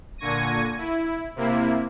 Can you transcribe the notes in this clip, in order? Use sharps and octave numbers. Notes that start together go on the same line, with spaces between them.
A#2 D3 C#6 G#6 A#6 D#7
E4
C3 A#3 E4